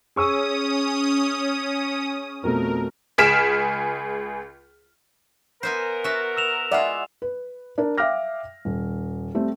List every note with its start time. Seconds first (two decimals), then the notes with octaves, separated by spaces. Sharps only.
0.16 C#4 G#4 C#6 D#6 E6
2.43 F2 B2 A3 A#4
3.18 C#2 G#4 F6 B6 D7 E7
5.63 B3 A#4 C5 E5 G#5
6.04 F#4 E5 A5
6.37 E6 E7 F7
6.71 G#3 E4 F4 D5 E5 F#5
7.22 B4
7.78 D4 A#4
7.98 E5 F5 G5 D6 F6 A#6
8.65 D#1
9.35 G3 A3 C4